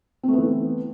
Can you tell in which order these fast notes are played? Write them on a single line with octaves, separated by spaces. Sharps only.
C4 A3 B3 E3